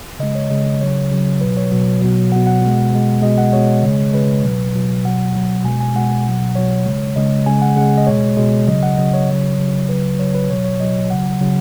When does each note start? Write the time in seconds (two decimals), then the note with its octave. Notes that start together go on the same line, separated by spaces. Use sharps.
0.19 C#3 G#3 D#5
0.35 C#5
0.50 C#3 G#3 D#5
0.80 C#3 F#3 C#5
1.11 C#3 F#3
1.41 B2 F#3 B4
1.57 C#5
1.72 B2 F#3
2.02 B2 F#3
2.32 B2 F#3 F#5
2.47 F#5
2.62 B2 G#3
2.93 B2 G#3
3.22 B2 G#3 D#5
3.38 F#5
3.53 B2 G#3 C#5
3.83 C#3 G#3
4.13 C#3 G#3 B4
4.44 B2 F#3
4.75 B2 F#3
5.04 B2 F#3 F#5
5.35 B2 F#3
5.65 B2 G#3 G#5
5.80 G#5
5.95 B2 G#3 F#5
6.25 B2 F#3
6.55 B2 F#3 C#5
6.86 C#3 G#3
7.16 C#3 G#3 D#5
7.46 C#3 G#3 G#5
7.62 F#5
7.77 C#3 G#3 F#5
7.98 D#5
8.07 B2 G#3 C#5
8.37 B2 G#3
8.68 C#3 F#3 D#5
8.83 F#5
8.97 C#3 F#3 D#5
9.14 C#5
9.28 C#3 F#3
9.58 C#3 F#3
9.89 C#3 F#3 B4
10.19 C#3 F#3 C#5
10.35 B4
10.49 B2 F#3 C#5
10.64 C#5
10.80 B2 F#3 D#5
11.10 C#3 F#3 F#5
11.41 C#3 F#3